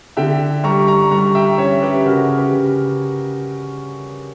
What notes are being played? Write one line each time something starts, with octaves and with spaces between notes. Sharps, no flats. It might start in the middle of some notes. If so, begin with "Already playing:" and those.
D3 E5 G5
G3 A#5 C#6
A#5 C#6
G3 A#5 C#6
E5 G5
C#4 C#5 E5
G4 B4
C#3 F#4 A#4
G4 B4
C#3